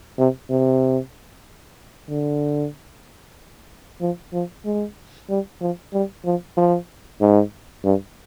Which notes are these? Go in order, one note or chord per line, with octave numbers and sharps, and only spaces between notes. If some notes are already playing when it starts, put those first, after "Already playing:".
C3
C3
D3
F3
F3
G#3
G3
F3
G3
F3
F3
G#2
G2